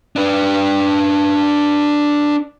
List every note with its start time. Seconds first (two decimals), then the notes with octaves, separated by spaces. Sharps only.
0.16 D4 B4